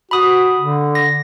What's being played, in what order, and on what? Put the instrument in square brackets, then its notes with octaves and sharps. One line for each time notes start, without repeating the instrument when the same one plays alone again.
[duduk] F#4 [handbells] B5 D#6
[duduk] D3
[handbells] A#6